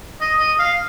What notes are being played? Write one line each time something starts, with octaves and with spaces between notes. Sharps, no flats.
D#5
D#5
F5